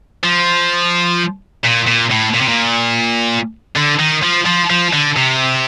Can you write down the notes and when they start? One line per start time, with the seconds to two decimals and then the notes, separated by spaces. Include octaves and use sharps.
0.23 F3
1.64 A#2
1.88 A#2
2.11 A2
2.35 A#2
2.41 C3
2.48 A#2
3.76 D3
3.99 D#3
4.23 F3
4.46 F3
4.70 F3
4.93 D3
5.17 C3